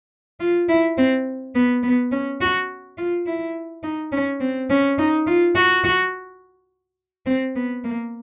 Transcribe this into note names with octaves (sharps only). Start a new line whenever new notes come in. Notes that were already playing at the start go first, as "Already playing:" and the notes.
F4
E4
C4
B3
B3
C#4
F#4
F4
E4
D#4
C#4
C4
C#4
D#4
F4
F#4
F#4
C4
B3
A#3